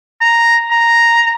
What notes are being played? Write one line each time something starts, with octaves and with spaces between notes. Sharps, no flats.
A#5
A#5